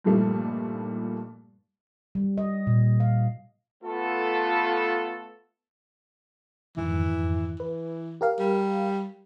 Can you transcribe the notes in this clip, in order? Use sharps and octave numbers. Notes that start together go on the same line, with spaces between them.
G2 A#2 F3 G3 A3 D#4
G3
D#5
A#2
F5
A3 B3 F4 A4
F2 G#2 D#3 E3
E3 B4
G4 A#4 F5
G3